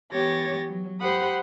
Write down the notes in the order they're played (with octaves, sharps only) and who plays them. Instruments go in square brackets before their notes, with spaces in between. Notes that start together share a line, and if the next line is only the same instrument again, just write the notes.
[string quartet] E3 B3 G4 C#5 A6 A#6
F#3
G4 C5 F#5 B5 D#6